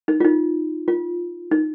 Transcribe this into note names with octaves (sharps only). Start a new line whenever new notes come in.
D#4
F4
D#4
F4
D#4